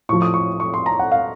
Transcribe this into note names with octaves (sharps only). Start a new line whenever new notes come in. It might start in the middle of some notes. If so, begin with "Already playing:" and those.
A2 F3 C#6
D#6
C#6
C#6
C6
A#5
F#5
F5